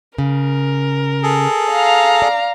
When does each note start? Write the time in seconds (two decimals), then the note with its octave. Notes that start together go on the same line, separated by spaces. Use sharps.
0.18 C#3 A#4
1.23 G#4 A4
1.71 F5 A#5
2.22 D5